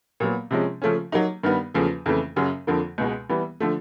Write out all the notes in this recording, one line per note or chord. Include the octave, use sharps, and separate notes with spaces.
A#2 F#3 B3
C3 F3 G#3 C#4
C#3 F3 A3 C#4
F#3 A#3 D#4
G2 D#3 G3 B3
E2 C#3 F3 A3
F2 C#3 E3 A3
F#2 C#3 F#3
F2 D3 F3 A#3
C#2 B2 G#3
E3 G3 B3
D3 F3 A3